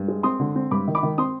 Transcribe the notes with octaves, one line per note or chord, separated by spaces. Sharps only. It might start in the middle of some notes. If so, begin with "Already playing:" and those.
Already playing: G2
G#3
C4 C6 D#6
D3
C4
G2 B5 D6
D#3
B5 D6
D#3
C4 C6 D#6